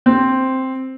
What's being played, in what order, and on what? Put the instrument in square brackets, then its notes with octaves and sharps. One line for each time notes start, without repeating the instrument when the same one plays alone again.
[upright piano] C4